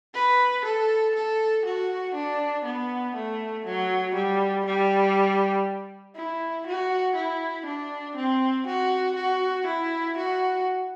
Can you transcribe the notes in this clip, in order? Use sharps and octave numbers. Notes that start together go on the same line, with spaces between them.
B4
A4
A4
F#4
D4
B3
A3
F#3
G3
G3
E4
F#4
E4
D4
C4
F#4
F#4
E4
F#4